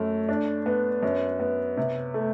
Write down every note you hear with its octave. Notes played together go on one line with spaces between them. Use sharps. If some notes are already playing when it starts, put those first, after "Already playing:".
Already playing: F#2 A3
D4
B3
F#2
B3
C3
A3